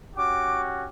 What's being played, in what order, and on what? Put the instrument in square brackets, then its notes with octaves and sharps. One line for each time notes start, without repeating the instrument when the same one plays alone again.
[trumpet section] C#4 F#4 G4 [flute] D6